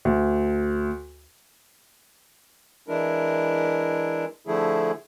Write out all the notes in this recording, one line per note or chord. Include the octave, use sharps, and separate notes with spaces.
D2
E3 G#3 D4 E4 A#4
D3 F3 A3 E4 G#4